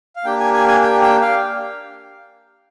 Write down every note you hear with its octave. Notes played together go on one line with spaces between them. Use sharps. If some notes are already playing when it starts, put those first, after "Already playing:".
F5
A#3 D4 G4 G5
G#5
G#5
G#5
G5
G5
F5